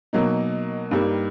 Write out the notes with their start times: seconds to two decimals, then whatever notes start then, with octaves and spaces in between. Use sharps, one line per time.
0.13 B2 F#3 A#3 D#4
0.91 G2 D#3 G3 A#3